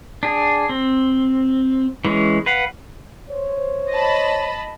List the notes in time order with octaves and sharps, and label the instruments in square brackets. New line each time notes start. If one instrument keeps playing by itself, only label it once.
[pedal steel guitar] D4 G#4
C4
E3 G#3 C#4
B4 F5 F#5
[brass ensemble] C5 C#5
[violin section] D#5 A5 B5